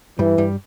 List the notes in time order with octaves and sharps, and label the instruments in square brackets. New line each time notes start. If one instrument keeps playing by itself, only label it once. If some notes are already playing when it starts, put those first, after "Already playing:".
[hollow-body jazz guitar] G2 G3 [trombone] E3
[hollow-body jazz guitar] G2 G3